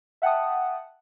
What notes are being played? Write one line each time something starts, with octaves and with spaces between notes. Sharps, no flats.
E5 F#5 G5 A5 D#6